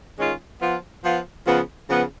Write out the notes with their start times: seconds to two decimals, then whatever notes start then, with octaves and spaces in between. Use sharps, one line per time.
0.18 D#3 G#3 C#4 F4
0.61 F3 B3 F4
1.04 F3 B3 F4
1.46 C#3 F3 B3
1.89 C#3 F3 B3